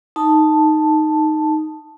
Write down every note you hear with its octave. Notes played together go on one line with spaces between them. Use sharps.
D#4 A5